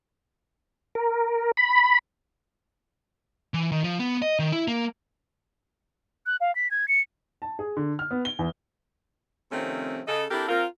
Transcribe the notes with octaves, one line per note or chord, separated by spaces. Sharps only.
A#4
B5
E3
D#3
F3
B3
D#5
D#3
E4
A#3
F#6
F5
B6
G#6
C#7
A5
G#4
D3
F6
B3
G7
E2
C3 D#3 F3 A3 C4 C#4
C#3 A4 D#5
C4 D4 E4 G4 A4 A#4
C4 F4 A#4